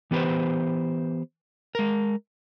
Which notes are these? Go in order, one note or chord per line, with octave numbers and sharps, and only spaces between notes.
E3 B3 G4 B4 C5
G#3 A#4